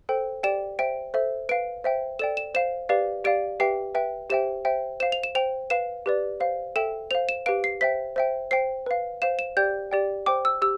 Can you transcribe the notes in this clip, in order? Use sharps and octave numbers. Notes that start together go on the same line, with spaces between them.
A4 C5 G5
G4 D5 G5 E7
C5 E5 G5 D7
A4 C5 E5
B4 F5 D7
C5 E5 G5
A4 D5 G5 E7
E7
C5 F5 E7
G4 B4 D5 F5
G4 D5 F5 D7
G4 B4 E5 G5 C7
B4 E5 G5
G4 C5 E5 G5 E7
C5 E5 G5
C5 F5 E7
F7
E7
C5 G5 F7
B4 F5 E7
G4 B4 D5
C5 F5
A4 E5 G5 E7
C5 F5 F7
E7
G4 B4 F5 D7
C7
C5 E5 G5 B6
C5 E5 G5
C5 G5 C7
B4 F5
C5 F5 E7
E7
G4 D5 G5 G6
G4 D5 G5
C5 G5 D6
E6
G4 E6